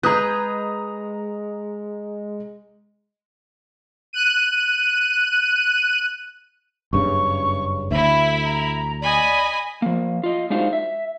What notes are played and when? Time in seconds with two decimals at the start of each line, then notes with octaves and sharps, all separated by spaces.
0.03 G#3 G#4 B4 A#5 D#6 G6
4.13 F#6 D#7
6.93 F#1 G2 C#3 C#6
7.91 D2 E4 E5 B5
8.45 A#5
9.01 D5 D#5 G#5 B5
9.82 F3 A#3
10.23 F4 D#5
10.50 G#3 D4 D#4 F4 F#4 C5
10.73 E5